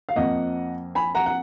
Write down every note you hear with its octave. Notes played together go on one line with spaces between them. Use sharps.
F5
F2 F3 A#3 D#5 F#5
G#5 B5
F#5 A#5
F#5